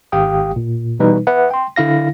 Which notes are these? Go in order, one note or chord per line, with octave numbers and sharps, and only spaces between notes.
G#1 G4 F5 G5 D#6
A#2
B2 E3 G3 D#4 B4
B4 E5 F#5
G5 C6
D3 E4 F5 A#6